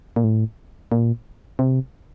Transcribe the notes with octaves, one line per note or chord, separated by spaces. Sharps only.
A#2
A2
A#2
C3